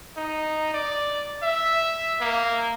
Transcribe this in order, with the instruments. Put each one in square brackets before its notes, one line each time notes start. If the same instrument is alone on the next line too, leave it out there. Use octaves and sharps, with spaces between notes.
[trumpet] D#4
D5
E5
A#3